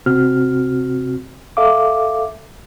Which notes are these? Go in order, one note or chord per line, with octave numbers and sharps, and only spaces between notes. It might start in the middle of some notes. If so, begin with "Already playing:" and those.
C3 C4 F#4 F6
A4 E5 F5 D6